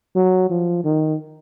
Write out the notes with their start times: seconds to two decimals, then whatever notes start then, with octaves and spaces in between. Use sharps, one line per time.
0.16 F#3
0.50 F3
0.85 D#3